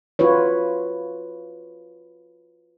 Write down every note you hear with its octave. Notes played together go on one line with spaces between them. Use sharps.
F4 F#4 B4 C#5